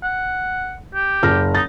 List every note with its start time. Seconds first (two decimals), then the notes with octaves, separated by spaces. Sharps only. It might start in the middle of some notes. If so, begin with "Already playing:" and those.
0.03 F#5
0.94 G4
1.23 F#1 F6 A#6
1.55 D#4 A6